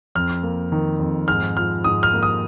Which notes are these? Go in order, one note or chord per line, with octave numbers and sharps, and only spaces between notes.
F2 F6
A#3
D#3
F2
G#2 F6
F3 F6
G#2 D#6
F6
A#3
D#6